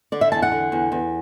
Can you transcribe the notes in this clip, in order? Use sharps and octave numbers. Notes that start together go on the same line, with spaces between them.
D3 D5
E5
E2 A5
F#5
D3
E2
E2